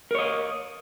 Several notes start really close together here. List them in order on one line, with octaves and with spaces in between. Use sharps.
A#4 C#5 D#5